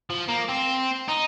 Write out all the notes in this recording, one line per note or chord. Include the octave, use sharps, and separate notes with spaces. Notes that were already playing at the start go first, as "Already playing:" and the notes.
F3
A#3
C4
D#4